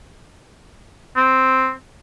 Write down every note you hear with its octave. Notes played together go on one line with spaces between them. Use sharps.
C4